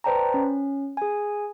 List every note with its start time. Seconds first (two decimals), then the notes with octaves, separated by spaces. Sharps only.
0.04 B4 C5 D5 G5 A5 A#5
0.34 C#4
0.97 G#4 G#5